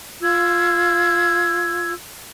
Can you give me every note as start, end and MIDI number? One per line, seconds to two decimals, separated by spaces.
0.22 1.92 65
0.22 1.92 88
0.22 1.92 92